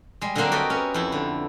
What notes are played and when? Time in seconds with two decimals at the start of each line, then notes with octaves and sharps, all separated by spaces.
0.21 G3 G#3
0.36 D3 F#3 G3 A#3 C4 D4
0.52 F#4 G4 A4 A#4 D5 D#5
0.70 B3 C#4 A#4
0.94 F2 E4 G5
1.12 D3